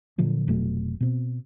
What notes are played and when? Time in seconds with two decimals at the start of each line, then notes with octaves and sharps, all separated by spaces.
0.18 A#2 D3 F3 F#3
0.48 F1 B2 F#3 A3
1.00 B2 C4